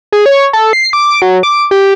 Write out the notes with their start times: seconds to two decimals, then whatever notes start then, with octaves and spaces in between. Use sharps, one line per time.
0.12 G#4
0.26 C#5
0.53 A4
0.73 C7
0.93 D6
1.22 F#3
1.43 D6
1.71 G4